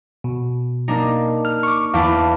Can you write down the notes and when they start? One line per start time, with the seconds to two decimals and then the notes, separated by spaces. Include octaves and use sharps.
0.24 B2
0.88 A#3 D4 D#4
1.45 F6
1.63 C#6 D6
1.94 E2 F5 A5 B5 D6